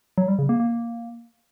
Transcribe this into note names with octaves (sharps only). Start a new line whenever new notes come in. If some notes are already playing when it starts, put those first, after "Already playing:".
F#3
G3
C#3
A#3
A#3